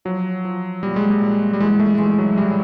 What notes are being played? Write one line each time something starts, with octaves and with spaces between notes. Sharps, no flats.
F3 F#3
F3
A#2 G3
G#3
G3
A#2
G3
E3 G#3
A3
E3 G#3
F#3
A2 G3